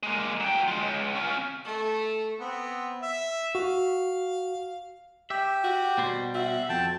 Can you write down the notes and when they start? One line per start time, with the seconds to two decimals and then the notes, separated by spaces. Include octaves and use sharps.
0.03 G#3 A#3
0.40 F#3 G5
0.68 G#3 F4
0.82 C#2
1.15 C#4 F4
1.64 A3
2.40 B3 C4
3.02 E5
3.55 F#4 F5
5.30 G4 E5
5.64 F#4
5.98 B2 G3 C5
6.35 F#4 E5
6.69 F2 G5 A5